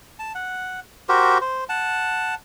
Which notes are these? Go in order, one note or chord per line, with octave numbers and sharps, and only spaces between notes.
A5
F#5
F#4 G4 A#4 C5
C5
F#5 A5